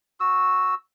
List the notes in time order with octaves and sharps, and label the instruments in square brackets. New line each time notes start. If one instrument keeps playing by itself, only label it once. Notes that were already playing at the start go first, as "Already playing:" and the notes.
[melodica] F#4 E6